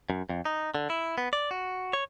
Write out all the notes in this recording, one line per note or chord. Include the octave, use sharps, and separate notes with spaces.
F#2
F2
D#4
D3
E4
B3
D5
F#4
C#5